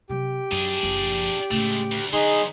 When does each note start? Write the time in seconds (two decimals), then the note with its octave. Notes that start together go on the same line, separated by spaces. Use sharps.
0.09 C3 F#3 G4
0.52 F#2 D4 G#4
0.83 F#1 F3
1.51 A2 C#3 G#3 A3
1.92 D2
2.13 D3 F#3 B3 D#4 G#4 C6